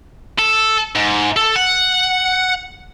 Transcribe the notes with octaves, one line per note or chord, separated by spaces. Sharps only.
A4
G#2
A4
F#5